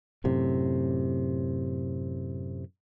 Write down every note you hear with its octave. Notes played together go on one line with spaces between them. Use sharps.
F#2 A2 C3